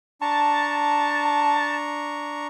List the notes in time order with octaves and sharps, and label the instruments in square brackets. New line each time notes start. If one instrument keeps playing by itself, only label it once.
[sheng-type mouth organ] D4 A#5 C#6 [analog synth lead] A5